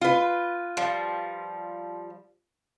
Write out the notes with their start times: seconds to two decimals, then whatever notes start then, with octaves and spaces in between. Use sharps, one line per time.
0.01 F4 B4
0.77 F3 G3